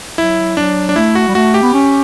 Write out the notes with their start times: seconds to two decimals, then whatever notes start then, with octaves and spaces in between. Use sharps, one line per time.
0.18 F#3 E4
0.57 F#3 D4
0.89 D4
0.96 A3 E4
1.15 F#4
1.28 G3
1.35 A3 F#4
1.54 G4
1.63 B3
1.74 C#4